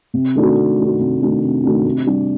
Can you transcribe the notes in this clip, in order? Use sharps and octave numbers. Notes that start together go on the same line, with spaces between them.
C3
D#3 A3 D4 F#4
C3
D#3 A3 D4 F#4
C3
D#3 A3 D4 F#4
C3
D#3 A3 D4 F#4
C3
G3 D4